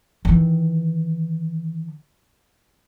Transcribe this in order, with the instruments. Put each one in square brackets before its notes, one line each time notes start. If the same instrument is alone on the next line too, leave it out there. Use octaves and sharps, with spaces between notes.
[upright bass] D#3 E3